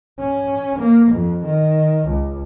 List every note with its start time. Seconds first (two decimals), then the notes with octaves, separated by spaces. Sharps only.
0.19 C#4
0.79 A#3
1.13 F2
1.45 D#3
2.07 C#2